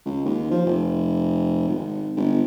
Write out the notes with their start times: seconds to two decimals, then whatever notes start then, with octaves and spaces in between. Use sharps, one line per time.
0.05 C#2
0.25 D#2
0.51 F3
0.66 F1
1.68 G#1
2.16 G1